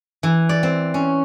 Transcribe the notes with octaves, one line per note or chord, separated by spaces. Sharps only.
E3
D5
C4
C#4